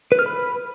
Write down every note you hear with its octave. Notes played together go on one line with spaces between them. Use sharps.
B4
F6
B5